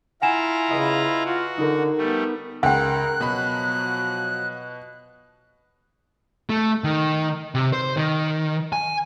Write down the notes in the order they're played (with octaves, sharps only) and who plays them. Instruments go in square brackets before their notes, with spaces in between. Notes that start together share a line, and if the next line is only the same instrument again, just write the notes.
[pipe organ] E4 F4 A#5 [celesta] F#5 G#5 E7
[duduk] C#3 [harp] B4 D#5
[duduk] F4 [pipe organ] F#4
[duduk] D3 [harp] D#4 A#4
[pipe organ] G3 A3 [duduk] B3
[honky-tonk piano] C#2 [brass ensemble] A#4 [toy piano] F#5 G5 [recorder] F#6
[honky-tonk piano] B2 B5 [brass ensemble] F3 F#3
[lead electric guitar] A3
D#3
C3
C5
D#3
G#5